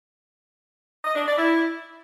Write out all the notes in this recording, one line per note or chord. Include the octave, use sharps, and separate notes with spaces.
D#5
D4
D5
E4